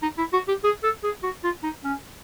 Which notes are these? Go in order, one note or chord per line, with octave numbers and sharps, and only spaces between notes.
D#4
E4
F#4
G4
G#4
A4
G#4
F#4
F4
D#4
C#4